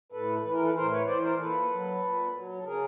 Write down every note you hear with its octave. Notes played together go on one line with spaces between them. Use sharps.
A2 A4 B4
E3 B4
A#4
A4 B4
A2 A#4 C5
B4 C#5
E3 C5 D5
A#4 C5
A#2 A4 B4
F#3
A#2
F#3
A4
C#3 G#4 A#4